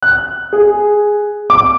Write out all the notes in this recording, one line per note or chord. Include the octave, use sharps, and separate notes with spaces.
F#6
G#4
D6